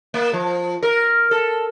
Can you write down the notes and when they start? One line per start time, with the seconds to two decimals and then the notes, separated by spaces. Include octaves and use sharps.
0.14 A#3
0.33 F3
0.83 A#4
1.31 A4